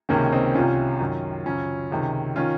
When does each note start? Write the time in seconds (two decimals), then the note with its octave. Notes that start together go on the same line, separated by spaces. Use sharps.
0.09 C#2 C3 D#3 A#3 C#4
0.32 C4 D#4
0.54 C2 C3 F3 C#4 F4
0.99 F#2 D#3
1.45 F#2 C#3 F3 C#4 F4
1.91 C#2 C3 D#3
2.36 D#3 C#4 F4